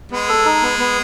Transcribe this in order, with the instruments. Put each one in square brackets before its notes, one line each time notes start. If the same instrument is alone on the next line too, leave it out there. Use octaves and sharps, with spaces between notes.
[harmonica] G#3 [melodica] B3
[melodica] A4
D#4
B3
B3